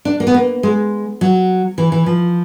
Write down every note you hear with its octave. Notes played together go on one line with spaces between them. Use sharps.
D4
A#3
B3
A#3
G#3
F#3
E3
E3
F3